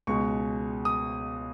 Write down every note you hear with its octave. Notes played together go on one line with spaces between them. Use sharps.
C#2 B2 G#3 C#6
D#6